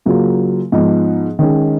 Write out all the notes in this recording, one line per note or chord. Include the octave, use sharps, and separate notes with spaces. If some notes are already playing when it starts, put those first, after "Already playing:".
C#3 F#3 A#3 F4
G#2 F3 B3 D#4
D#3 G#3 C#4